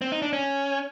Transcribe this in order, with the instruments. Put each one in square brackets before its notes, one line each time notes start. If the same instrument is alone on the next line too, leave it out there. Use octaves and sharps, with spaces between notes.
[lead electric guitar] C4
D#4
D4
C#4